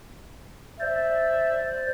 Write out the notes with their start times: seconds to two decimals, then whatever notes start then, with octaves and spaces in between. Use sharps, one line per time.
0.80 C5 D5 E5